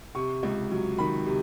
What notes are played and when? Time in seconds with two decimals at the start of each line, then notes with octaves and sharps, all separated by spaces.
0.15 C3 C#6
0.43 C#2
0.71 F#3
0.98 D#3 B5
1.26 C3